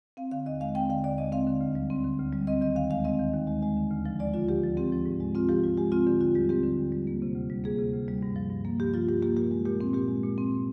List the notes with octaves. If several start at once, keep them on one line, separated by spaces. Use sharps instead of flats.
C4 F5
D3 F5
D#2 D#5
G#3 F5
C4 G5
D3 F5
D#2 D5
G#3 D#5
C4 F5
D3
D2
G3
C4
D3
D2
G3
C4 D#5
D#3 D#5
D#2 F5
G#3 F5
C4 D#5
D#3
D#2
G#3
G#3
D3
D2
F3
G#3 D5
D3 F4
D2 G4
F3
C4 G4
F3
G#2
G#3
C4 F4
F3 G4
G#2 F4
G#3 G4
C4 F4
D3 G4
D#2 F4
G3 G4
C4 G4
D3
D#2
G3
A#3
C3
D2
G3
A#3 G#4
C3
D2
G3
G2
F3
G2
A#3
G2 G4
F3 F4
G2 G4
A#3 G4
A#2 G4
G#3
A#2 G4
C4
A#2 G4
G#3
A#2
C4